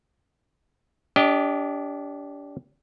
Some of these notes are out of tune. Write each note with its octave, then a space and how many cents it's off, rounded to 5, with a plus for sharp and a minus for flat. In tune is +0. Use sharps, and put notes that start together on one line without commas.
D4 -35 G4 +0 D#5 +0